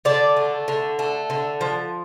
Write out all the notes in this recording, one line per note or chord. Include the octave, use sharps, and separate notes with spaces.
D3 D5
A3
D3
A3
D3
F3